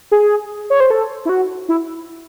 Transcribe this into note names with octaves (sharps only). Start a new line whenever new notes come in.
G#4
C#5
C5
A4
E4
F#4
E4